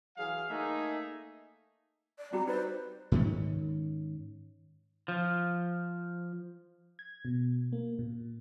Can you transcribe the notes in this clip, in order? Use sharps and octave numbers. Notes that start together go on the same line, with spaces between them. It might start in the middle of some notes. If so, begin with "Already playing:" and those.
E3 F#3 G#4 F5
A3 A#3 D#4 G#4 E5
D5
G3 C4 F#4 G4 A#5
D#4 B4 C5 D5
G#2 D#3 C#4
F3
G#6
B2
A#3
A#2